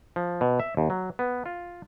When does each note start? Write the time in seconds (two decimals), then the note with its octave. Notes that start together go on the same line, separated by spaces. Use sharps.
0.16 F3
0.41 B2
0.60 E5
0.77 D#2
0.90 F#3
1.19 B3
1.46 F4